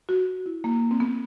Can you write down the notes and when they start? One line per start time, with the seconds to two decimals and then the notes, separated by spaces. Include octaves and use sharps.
0.09 F#4
0.46 E4
0.64 A#3
0.91 C4
1.00 B3